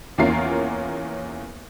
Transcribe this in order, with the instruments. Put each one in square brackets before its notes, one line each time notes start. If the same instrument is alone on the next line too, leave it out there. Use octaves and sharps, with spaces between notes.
[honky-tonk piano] E2 A#3 C#4 F4 A#4 C7